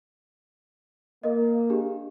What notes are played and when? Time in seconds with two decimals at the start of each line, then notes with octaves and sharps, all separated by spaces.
1.23 A#3 A#4 D#5
1.70 D4 G4 G#4